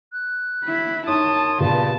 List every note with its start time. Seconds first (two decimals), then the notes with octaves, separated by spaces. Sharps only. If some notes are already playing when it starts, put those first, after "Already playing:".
0.13 F#6
0.64 E4 B5
1.07 F#2 D#4 C#5 A5 C6 D#6
1.60 G2 A#2 C#3 B3 A5 B5